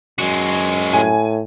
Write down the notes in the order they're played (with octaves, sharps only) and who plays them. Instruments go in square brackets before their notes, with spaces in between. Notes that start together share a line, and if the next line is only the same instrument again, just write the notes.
[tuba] F#2 [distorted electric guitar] G#3 F#4
[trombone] A2 [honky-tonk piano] G#5